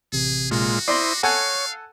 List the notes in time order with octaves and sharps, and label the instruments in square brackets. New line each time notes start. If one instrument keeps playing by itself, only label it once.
[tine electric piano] A1 C3 [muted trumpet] G#4
[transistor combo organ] A#2 G#3 F4 [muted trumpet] F#4
[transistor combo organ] E4 C5 D#6 [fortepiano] D5 C6 [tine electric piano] A#6 C7
[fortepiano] A4 F#5 G#5 [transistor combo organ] C#5 [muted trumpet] F5